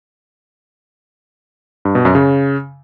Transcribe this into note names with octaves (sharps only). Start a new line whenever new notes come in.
G2
B2
F#2
C#3